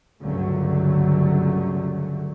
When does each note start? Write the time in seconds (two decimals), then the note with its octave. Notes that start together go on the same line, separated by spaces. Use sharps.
0.20 G1 C#2 F#2 D3 F#3 A3